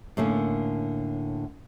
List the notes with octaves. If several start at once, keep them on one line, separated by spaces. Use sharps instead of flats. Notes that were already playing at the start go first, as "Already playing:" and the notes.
A2 D3 A#3 C#4